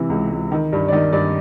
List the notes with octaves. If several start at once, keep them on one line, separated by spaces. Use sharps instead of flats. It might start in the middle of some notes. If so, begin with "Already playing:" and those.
Already playing: C3 E3
C#2
C#2
D#3
G2
D5
D#3 D#5
G2 D5